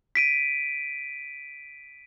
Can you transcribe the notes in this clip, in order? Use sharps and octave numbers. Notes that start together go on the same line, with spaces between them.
B6 D7 D#7